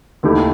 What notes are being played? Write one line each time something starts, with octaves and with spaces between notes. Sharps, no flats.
D#2 D#3 A3 E4 G4